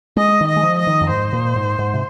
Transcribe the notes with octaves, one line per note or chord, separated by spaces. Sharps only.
G#3 D#5
D#3
D#5
G#3
F3
D#5
D#3
F2
G#2 C5
A#2
G#2
G#2
C3